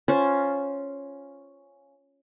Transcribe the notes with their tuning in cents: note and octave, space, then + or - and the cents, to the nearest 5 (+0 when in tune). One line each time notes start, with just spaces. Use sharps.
C#4 +0 F4 +0 C5 +0